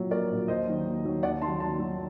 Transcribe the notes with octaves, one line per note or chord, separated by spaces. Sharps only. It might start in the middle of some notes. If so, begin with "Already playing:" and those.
Already playing: A#1 A#2 F#3
A#1 A#4 D5
A#2 F#3
D#2 C5 D#5
D#3 F#3
D#2
D#3 F#3
D#2 D5 F#5
D#3 A5 C6
F#3
D#2 A5 C6
D#3 F#3